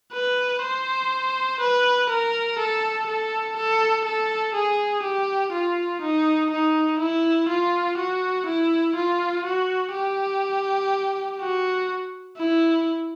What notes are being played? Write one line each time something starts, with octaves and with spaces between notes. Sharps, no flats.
B4
C5
B4
A#4
A4
A4
A4
A4
G#4
G4
F4
D#4
D#4
E4
F4
F#4
E4
F4
F#4
G4
F#4
E4